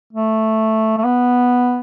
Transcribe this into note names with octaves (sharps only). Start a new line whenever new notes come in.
A3
A3
B3